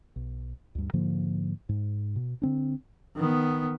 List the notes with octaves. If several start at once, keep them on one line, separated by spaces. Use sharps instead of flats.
B1
D2 G2
G#2 D3 F3 A#3
G#2
B2
D3 C4 D4
D#3 B3